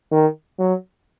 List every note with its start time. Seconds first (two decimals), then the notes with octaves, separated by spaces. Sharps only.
0.12 D#3
0.59 F#3